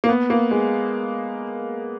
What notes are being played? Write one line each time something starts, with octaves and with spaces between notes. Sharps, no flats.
A#3
B3
A#3
G#3